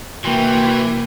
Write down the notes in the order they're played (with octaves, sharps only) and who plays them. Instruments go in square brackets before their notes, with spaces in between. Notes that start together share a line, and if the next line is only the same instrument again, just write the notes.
[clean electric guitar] C2 A#3 [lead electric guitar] E3 [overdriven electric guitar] F#4 C6 [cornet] G5